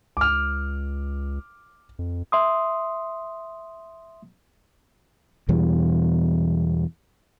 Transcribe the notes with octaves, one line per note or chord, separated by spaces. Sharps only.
C#2 D6 F6
F2
E5 C6 D#6
E2 B2 E3 G3